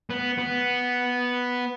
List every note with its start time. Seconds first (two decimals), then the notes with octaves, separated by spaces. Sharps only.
0.10 B3
0.38 B3